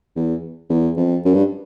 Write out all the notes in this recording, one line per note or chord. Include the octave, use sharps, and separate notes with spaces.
E2
E2
F2
F#2
G2